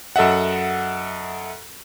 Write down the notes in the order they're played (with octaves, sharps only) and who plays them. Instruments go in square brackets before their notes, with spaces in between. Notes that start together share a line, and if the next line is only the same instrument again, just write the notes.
[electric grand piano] F#2 A4 D#5 E5 F#5